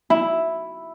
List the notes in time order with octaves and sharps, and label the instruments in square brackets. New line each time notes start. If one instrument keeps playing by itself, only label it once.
[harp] E4